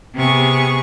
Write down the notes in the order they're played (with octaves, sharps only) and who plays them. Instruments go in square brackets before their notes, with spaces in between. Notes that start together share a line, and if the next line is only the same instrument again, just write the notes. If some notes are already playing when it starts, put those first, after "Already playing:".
[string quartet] C3 B3 G#4 C#6